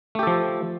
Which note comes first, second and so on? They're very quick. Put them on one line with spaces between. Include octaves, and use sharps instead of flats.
A3 G4 A4 F3